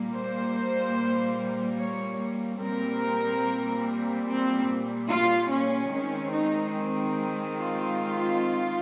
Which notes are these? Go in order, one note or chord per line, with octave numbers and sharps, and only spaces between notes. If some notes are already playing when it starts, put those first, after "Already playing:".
Already playing: A#2 G3 A#3
C5
C#5
A#2 G3 C4 A#4
C4
F4
C#4
D#3 G#3 C4 C#4
D#4
F4